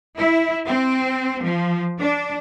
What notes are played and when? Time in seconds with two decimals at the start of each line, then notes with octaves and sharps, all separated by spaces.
0.17 E4
0.67 C4
1.44 F3
2.00 D4